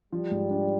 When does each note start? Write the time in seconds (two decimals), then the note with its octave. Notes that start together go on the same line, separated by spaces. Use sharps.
0.12 F3 G3
0.31 G#2
0.50 D4